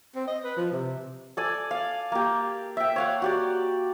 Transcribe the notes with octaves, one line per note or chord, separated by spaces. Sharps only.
C4
D#5
B4
F3
C3
A4 D5 G#5
F5
A#3 G4
E5 G5
C#5 F5 F#5
F#4 G4 D5